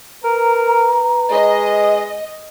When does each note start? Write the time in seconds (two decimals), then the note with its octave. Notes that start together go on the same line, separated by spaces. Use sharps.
0.24 A#4 B4 A#5
1.31 G#3 D#5